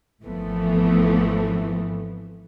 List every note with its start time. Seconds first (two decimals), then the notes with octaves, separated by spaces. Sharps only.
0.24 G#1 E3 F3 A3 B3